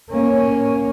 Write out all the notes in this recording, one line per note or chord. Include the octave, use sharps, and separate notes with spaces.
A#3 C#4